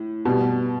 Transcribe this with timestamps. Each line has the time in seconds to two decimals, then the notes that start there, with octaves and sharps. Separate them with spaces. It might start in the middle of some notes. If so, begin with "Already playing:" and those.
Already playing: A2
0.25 B2 G3